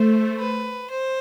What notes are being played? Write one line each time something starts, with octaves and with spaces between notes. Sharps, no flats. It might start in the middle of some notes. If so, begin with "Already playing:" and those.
Already playing: A3 C5
B4
C5